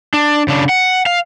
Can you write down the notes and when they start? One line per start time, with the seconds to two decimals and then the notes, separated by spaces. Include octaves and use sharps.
0.14 D4
0.48 C#3 D4
0.69 F#5
1.06 F5